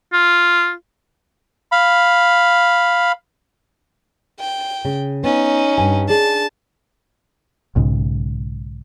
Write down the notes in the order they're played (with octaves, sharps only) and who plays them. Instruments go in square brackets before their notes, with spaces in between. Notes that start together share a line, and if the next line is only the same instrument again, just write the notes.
[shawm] F4
[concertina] F5 B5
[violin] G5
[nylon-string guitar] C#3
[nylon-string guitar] B3 [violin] C#4 D#4
[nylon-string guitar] G2 G#5
[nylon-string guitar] D4 G#4 [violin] A5
[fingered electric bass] B1 G#2 C#3